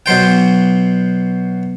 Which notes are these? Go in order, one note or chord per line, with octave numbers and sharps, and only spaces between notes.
B2 F#3 C5 G5